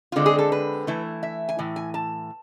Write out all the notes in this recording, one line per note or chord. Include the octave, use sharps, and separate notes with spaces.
D3 G#3 C4 F4
G#4
A4
B4
E3 A3 E4
E5
G#5
A2 E3
G#5
A5